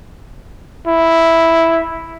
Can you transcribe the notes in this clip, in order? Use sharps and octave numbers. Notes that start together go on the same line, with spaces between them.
E4